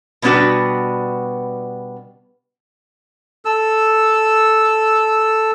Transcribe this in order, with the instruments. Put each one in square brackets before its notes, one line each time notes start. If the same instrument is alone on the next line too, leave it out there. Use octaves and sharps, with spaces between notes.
[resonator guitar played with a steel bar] B2 G3 B3 D4 F#4 B4
[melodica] A4 E6